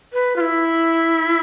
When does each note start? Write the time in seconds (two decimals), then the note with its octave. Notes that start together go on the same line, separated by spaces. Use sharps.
0.13 B4
0.36 F4
0.41 E4